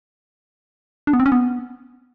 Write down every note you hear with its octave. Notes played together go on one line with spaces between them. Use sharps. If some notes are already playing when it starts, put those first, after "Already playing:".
D4
B3
C4
C#4
B3